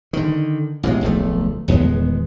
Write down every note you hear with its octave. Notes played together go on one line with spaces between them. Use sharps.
D3 D#3
A1 B2 E3 G#3
D1 B1 F3 A3
D#1 E2 G#3 B3